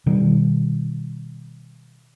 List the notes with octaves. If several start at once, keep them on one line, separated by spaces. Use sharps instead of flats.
B2 D#3 G3